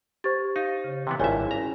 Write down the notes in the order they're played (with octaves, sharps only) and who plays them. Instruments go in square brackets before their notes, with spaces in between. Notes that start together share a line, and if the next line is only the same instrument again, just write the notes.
[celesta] G4 C5 [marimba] C#6 G#6 A6
[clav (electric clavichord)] D#4 [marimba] F5
[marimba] C#3
[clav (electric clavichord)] C3 E3 B3
[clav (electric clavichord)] G#1 G2 E5 [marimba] E4 F4 G#4 [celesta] C#5 G#5
[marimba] C#4 [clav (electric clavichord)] A#5